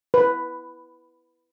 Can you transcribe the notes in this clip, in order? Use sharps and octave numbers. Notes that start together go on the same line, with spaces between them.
B4